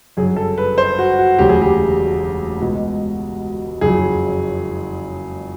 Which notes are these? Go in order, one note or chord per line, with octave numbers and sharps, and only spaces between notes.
G1 F#2 C#3 G#4
A4
B4
C5
F#4
F#4
E1 D2 C#3 F#3 G4
G#4
G4
C#2 B2 G#3
F#1 F2 C#3 F#3 G#4